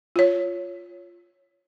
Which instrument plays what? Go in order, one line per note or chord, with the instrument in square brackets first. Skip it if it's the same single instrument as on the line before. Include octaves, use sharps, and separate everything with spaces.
[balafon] F4 C#5